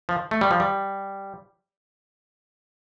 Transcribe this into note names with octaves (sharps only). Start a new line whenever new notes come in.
F3
A3
G3
F3
G3